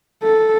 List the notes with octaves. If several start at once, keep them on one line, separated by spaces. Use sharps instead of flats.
A4